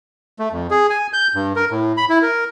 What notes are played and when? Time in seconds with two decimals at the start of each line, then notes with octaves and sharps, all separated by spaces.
0.39 A3
0.52 F2
0.71 G#4
0.90 G#5
1.13 G6
1.35 G2
1.56 A#4
1.71 A2
1.97 B5
2.10 E4
2.22 A#4